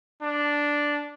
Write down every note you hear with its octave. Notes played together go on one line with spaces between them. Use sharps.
D4